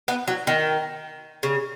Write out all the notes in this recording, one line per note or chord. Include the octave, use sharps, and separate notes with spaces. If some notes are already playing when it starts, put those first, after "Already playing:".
B3
F#3
D#3
C#3